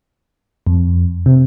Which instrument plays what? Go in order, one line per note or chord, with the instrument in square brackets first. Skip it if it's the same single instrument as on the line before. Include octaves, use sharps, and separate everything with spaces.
[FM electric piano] F2
C3